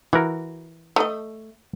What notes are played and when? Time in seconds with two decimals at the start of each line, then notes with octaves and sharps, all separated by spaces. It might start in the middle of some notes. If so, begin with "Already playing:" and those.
0.13 E3 F#4 A#4
0.96 A3 D#5